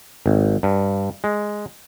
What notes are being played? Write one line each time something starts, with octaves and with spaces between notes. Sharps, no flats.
G#1
G2
G#3